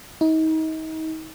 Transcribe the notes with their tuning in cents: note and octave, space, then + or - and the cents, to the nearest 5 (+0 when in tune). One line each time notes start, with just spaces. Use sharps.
D#4 +35